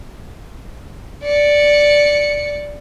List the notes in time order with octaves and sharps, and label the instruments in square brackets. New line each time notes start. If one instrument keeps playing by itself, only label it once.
[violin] D5 C#7